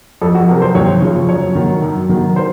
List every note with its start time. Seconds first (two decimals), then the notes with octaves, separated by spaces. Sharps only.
0.22 F2 A4
0.35 F#4
0.48 C3 F#3 A#4
0.62 C5
0.75 D#2 C#5
1.02 C#3 F3
1.29 F#2 C#5
1.55 D#3 F#3
1.82 F#2
2.09 D#3 F#3
2.36 C5